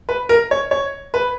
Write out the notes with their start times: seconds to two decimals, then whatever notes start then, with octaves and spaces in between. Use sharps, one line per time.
0.09 B4
0.29 A#4
0.51 C#5
0.71 C#5
1.14 B4